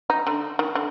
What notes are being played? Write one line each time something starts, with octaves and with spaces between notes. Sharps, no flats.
D#4
D3
D#3
D3